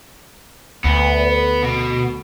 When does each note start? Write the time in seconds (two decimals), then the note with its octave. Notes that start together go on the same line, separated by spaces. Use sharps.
0.84 D2 B3
1.63 B2